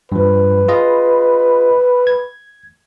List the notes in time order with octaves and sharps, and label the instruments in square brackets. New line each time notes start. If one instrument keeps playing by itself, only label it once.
[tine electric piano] G2 F3 [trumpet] B4
[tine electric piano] F4 G#4 D#5
G#6